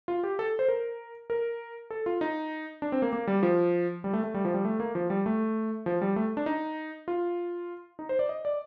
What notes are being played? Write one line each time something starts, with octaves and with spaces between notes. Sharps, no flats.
F4
G4
A4
C5
A#4
A#4
A4
F4
D#4
D4
C4
A#3
A#3
G3
F3
G3
A3
A3
G3
F3
G3
A3
A#3
F3
G3
A3
F3
G3
A3
D4
D#4
F4
D#4
C5
D5
D#5
D5